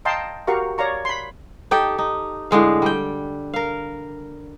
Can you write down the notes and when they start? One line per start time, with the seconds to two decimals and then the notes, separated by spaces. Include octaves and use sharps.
0.05 D#5 F5 G5 A5 A#5 C6
0.47 F#4 G4 A#4 F5 C#6
0.78 C#5 D5 F5 A#5 C#6
1.05 B5 C6
1.71 D#4 G4 A4 G5
1.98 D#4
2.51 A2 D3 G#3 F5
2.82 G3 G5
3.54 A#4 F5